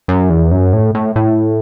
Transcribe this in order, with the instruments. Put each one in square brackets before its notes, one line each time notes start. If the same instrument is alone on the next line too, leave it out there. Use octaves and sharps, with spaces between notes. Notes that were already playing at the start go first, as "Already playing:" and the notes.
[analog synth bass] F#2
E2
F#2
A2
A2
A2